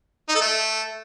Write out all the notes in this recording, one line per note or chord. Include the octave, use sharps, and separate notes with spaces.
D#4
A4
A3